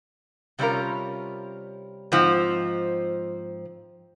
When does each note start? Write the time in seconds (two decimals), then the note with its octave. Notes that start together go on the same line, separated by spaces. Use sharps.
0.59 C3 G3 C#4 F4 A#4
2.12 G#2 F3 C4